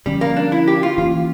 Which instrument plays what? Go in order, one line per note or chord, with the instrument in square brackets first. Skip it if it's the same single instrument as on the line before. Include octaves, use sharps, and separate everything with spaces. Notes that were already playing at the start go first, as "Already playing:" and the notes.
[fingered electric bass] D3 F3 C#4 [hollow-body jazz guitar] G3
[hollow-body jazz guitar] A#3
D4
E4
G4
F4
[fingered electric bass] E3 A#3 C#4 [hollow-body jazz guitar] F4